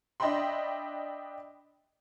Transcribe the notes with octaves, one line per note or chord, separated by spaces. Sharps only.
D4 D#5 E5 G5 B5 C6